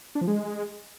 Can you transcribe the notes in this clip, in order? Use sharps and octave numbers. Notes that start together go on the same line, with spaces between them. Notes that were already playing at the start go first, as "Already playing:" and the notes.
D4
F3
G#3